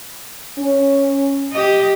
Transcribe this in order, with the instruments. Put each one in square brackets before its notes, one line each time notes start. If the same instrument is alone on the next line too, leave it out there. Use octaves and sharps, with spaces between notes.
[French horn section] C#4
[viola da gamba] G4 D#5